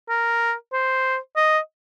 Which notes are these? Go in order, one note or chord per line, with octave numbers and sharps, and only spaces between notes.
A#4
C5
D#5